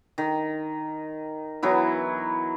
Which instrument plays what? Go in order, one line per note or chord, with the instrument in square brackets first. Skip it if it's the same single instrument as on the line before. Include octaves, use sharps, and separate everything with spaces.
[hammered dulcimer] D#3
E3 F#3 B3 E4